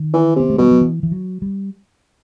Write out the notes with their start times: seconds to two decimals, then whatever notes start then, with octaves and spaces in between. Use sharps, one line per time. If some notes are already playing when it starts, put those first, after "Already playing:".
Already playing: D#3
0.13 E3
0.36 C3 B3
0.50 A3
0.58 B2 G3
0.71 F#3
0.81 E3
1.03 E3
1.12 F#3
1.42 G3